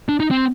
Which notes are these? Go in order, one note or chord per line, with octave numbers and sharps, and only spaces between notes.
D4
D#4
C4